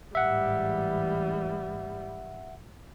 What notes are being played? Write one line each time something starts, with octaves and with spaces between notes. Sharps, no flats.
A1 G#2 E3 G3 E5 F#5